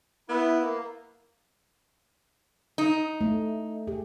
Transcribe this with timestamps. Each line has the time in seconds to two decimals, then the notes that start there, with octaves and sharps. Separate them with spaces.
0.29 B3 E4
0.62 A#3
2.78 D#4
3.21 A3
3.87 G4 G#4